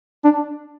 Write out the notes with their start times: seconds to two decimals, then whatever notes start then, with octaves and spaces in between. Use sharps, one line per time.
0.24 D4